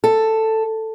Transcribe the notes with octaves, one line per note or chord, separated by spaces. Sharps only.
A4